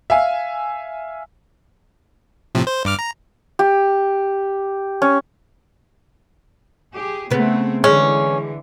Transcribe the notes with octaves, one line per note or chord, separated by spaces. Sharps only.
E5 F5 G#5
A2 C3 F3
C5
G2 D6 F6
A#5
G4
C#4
G4 G#4
C#3 A3 B3 C4
D3 E3 G#3 C#4